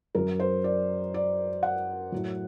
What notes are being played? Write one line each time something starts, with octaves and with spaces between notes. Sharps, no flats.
F#2 F#3 A#4
C5
D5
D5
F#5
A2 F#3